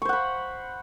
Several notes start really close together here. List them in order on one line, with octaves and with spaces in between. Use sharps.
C#6 C5 F#5 B5